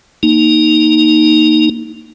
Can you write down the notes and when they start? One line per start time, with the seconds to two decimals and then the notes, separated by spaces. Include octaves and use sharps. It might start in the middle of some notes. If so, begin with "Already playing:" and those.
0.23 A#3 D#4